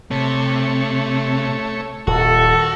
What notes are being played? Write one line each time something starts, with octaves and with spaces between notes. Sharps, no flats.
C3 A3 C#5
D#1 F#4 A4